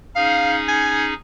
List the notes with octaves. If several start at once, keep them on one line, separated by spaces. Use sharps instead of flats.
C#4 D#4 G#4 F5
G#5